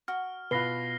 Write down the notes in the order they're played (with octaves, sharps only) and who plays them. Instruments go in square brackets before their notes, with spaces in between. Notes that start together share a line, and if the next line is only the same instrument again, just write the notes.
[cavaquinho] F#4 [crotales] F6
[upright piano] B2 F4 [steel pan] B4 [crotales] A#6 C7 G7